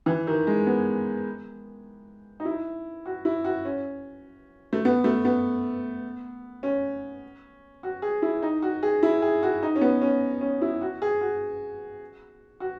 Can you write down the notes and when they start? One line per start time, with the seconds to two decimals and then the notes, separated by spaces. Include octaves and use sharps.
0.06 E3
0.27 D#3
0.47 G#3
0.67 B3
2.40 D#4
2.45 E4
3.06 F#4
3.25 E4
3.44 F#4
3.65 C#4
4.73 A3
4.85 B3
5.04 A3
5.25 B3
6.63 C#4
7.83 F#4
8.02 G#4
8.22 E4
8.42 D#4
8.62 F#4
8.83 G#4
9.03 E4
9.22 G#4
9.43 F#4
9.63 D#4
9.76 C#4
9.81 B3
10.02 C#4
10.41 C#4
10.62 E4
10.81 F#4
11.02 G#4
11.21 F#4
12.60 F#4